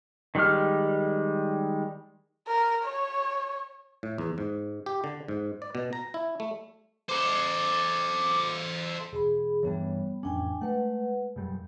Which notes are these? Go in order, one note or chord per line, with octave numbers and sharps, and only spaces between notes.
D#3 G3 G#3 G4 F6
A#4
C#5
A2
E2
G#2
G4
D3
G#2
D5
B2
A#5
E4
A3
A4 C5 D6
E1 G#4 B5
G2 E3 G3 B3 C#5
A1 F2 C#4 D4 G5 G#5
G#3 A3 B4 F#5
E1 F#2 G3